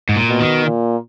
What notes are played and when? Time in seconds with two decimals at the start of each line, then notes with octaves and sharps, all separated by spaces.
0.09 G#2
0.16 A#2
0.29 B2
0.40 D#3
0.64 A#2